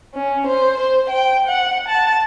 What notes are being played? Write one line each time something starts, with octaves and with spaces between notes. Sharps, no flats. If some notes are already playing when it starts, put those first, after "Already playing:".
C#4
C5
C5
G5
F#5
A5